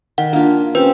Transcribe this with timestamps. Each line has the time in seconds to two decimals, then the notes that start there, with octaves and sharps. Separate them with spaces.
0.18 D#3 F#5
0.33 A#3 D4 F4
0.75 C4 C#4 G4 B4